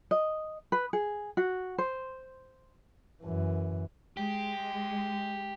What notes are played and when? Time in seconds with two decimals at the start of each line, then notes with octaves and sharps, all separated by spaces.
0.11 D#5
0.72 B4
0.93 G#4
1.37 F#4
1.78 C5
3.23 F#2 E3
4.17 G#3 G4